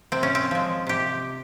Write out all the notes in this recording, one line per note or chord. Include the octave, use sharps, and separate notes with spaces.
C3 C4
C#4
C4
F3 G#3
C3 G4